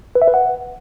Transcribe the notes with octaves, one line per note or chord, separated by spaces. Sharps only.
B4
E5
B4
F#5